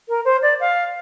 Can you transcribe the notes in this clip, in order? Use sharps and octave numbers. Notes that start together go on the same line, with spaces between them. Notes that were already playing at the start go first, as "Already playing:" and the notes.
A#4
C5
D5
F5